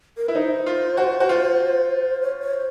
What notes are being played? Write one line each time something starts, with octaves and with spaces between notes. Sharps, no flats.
A#4
E4 B4
D#4 C5
F4
F#4
F#4
F4
C#5
C#5
C5